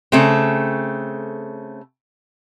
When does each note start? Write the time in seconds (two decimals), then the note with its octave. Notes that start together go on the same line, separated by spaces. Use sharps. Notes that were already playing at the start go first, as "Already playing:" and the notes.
0.12 C#3 A3 C4